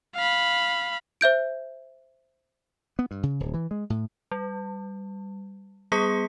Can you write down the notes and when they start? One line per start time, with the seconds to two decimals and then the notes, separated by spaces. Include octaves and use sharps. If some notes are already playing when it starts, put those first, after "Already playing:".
0.15 F5 B5
1.21 C5 E5 G6 D7
2.99 B3
3.11 G2
3.23 C#3
3.40 D1
3.54 E3
3.71 G#3
3.90 A2
4.31 G3
5.92 G3 B3 G#4 D#6 B6 C#7